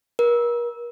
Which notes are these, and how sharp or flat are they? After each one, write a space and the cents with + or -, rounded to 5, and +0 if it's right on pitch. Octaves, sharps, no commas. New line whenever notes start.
A#4 +40